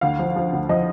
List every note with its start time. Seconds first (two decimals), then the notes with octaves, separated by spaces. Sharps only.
0.01 D2 F5
0.19 F3
0.36 F3
0.53 D2
0.69 F3 D#5